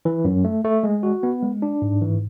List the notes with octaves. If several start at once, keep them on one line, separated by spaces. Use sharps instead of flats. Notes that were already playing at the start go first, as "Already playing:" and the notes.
E3
F#2
A3
A3
G#3
F#4
B3
G#3
D4
G#2
E3